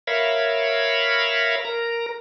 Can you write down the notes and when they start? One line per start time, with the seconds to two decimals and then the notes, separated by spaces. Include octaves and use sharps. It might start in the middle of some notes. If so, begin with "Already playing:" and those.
0.07 A#4 C#5 E5 F5 B5
1.65 A#4 A#5